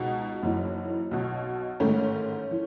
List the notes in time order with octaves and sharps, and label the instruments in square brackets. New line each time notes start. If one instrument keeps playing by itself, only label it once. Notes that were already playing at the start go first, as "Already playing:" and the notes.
Already playing: [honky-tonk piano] C#2 B2 D#4 F#4
F#1 F#2 E3
B1 B2
A1 G#2 D#3 A3 C#4
E3